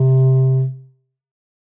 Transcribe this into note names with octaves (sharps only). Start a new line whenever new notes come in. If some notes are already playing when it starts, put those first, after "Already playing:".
Already playing: C3